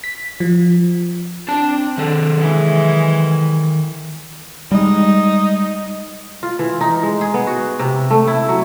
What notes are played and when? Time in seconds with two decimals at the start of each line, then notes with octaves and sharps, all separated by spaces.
0.04 B6
0.40 F3
1.48 C4 D4 A5
1.98 D#3 A4
2.38 E3 G#3
4.71 G3 G#3 D#4
6.43 F4
6.59 E3
6.81 D#4
7.03 G#3
7.21 G#4
7.34 B3
7.47 F#4
7.79 C3
8.11 A3
8.27 E4
8.49 F#3